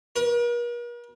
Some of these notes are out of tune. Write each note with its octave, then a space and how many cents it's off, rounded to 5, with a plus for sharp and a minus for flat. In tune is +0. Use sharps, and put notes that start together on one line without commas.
A#4 +45